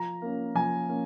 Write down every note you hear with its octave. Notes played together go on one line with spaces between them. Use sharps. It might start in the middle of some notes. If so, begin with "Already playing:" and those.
Already playing: F3 A#5
A#3 C#4
F3 G#5
A#3 C#4